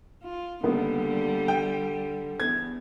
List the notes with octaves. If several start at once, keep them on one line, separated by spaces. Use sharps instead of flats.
F4
C#2 D3 G3 A#3 B3
G5
E2 G#6